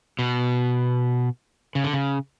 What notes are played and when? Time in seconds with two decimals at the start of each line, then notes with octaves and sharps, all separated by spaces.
0.19 B2
1.75 C#3
1.84 D3
1.94 C#3